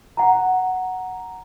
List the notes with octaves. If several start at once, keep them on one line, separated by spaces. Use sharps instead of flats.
F#5 A#5